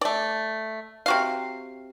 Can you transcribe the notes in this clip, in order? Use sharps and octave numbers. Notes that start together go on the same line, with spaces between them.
A3 D5
C3 F#4 F5